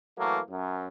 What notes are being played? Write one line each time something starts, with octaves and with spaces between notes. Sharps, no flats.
E3 F#3 A3 A#3
F#2